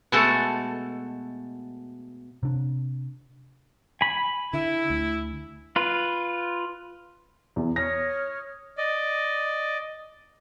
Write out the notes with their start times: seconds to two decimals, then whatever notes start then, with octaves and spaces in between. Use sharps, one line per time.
0.12 B2 G#3 A3 F#4 A4
2.43 C3 D4
4.01 G#5 B5
4.53 D3 E4
4.90 D2
5.76 F4 B4
7.56 E2
7.76 C#5 D#6 F6 A#6
8.77 D5 D#5